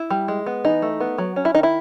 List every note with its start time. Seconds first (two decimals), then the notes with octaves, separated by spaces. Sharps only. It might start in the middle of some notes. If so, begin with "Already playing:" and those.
Already playing: E4
0.11 G3
0.28 G#3
0.46 B3
0.65 E3 D#4
0.82 A3
1.00 B3
1.18 F#3
1.36 C#4
1.45 E4
1.55 D#3 D#4
1.63 E4